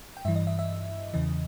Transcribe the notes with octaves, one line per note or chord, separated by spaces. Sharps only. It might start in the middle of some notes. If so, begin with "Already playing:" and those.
G5
G2 E3 E5
D#5
E5
E5
E2 C#3 E3 D#5